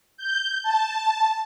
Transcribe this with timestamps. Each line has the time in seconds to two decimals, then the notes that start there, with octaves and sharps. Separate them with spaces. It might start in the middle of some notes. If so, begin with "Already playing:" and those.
0.17 G6
0.63 A5